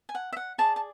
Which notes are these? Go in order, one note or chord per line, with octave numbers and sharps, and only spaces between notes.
G#5
F#5
E5
F#5
G#4 D5 A5
A5